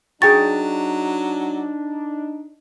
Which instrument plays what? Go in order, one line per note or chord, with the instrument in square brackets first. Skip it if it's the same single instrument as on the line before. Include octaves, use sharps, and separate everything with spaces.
[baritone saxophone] F#3 [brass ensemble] D4 D#4 [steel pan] G#4 G5 C#6 [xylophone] A6